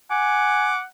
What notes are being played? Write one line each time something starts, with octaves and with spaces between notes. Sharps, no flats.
F#5 G#5 D6